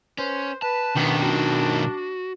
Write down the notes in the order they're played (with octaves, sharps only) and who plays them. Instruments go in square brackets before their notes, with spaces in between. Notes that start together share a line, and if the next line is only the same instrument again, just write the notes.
[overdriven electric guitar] C#4 [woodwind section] B4 C5
[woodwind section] B4 [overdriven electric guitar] A5
[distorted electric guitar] B1 D#3 [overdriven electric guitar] B3 [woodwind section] D4
[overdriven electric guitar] F#4